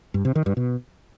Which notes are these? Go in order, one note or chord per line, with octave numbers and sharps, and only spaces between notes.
G2
C3
D#3
G2
B2